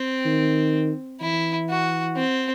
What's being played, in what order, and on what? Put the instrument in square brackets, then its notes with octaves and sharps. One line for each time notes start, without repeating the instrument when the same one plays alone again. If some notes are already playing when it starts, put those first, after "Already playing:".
Already playing: [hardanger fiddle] C4
[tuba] D#3
[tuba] E3 [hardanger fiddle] E4
[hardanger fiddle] F#4
C4